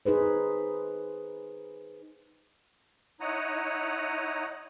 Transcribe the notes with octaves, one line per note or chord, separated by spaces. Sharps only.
D#4 G#4 B4 C5
D#4 E4 C#5 F#5 A#5 D#6